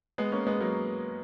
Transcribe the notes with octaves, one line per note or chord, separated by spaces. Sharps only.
G#3 B3
A#3 C#4
G#3 B3
F#3 A#3